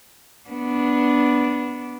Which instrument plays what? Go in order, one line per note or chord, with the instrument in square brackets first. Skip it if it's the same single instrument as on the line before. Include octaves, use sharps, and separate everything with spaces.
[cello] B3 D4